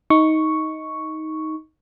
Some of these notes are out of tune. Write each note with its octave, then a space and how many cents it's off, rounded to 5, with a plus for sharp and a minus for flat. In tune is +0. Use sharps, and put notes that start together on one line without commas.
D#4 +15 C#6 +0